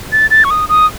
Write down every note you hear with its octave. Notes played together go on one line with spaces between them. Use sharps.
A6
A6
C#6
D#6
D#6